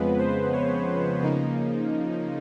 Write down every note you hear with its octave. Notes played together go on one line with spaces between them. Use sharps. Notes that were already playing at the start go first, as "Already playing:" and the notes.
Already playing: F2 C#3 F3 G#3 B3 B4
C5
C#5
C#3 F3 A#3 D#4